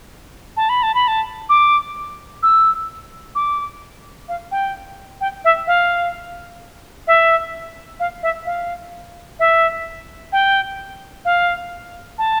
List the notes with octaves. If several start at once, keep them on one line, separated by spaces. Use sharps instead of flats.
A5
B5
A5
B5
A5
D6
E6
D6
F5
G5
G5
E5
F5
E5
F5
E5
F5
E5
G5
F5
A5